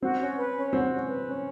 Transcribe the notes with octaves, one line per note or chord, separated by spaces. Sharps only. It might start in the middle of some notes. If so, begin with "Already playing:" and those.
C4 F#4
C#4
B4
C#4
C4 F#4
C#4
B4
C#4